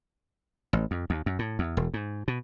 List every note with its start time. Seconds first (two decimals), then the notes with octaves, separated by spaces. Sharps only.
0.73 A1
0.91 F2
1.10 D#2
1.26 F#2
1.39 A2
1.59 E2
1.77 E1
1.94 G#2
2.28 B2